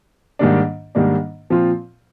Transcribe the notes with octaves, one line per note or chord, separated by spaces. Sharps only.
G#2 D#3 G3 A#3 D4
G#2 D#3 G3 A#3 D4
A#2 F3 C4 F4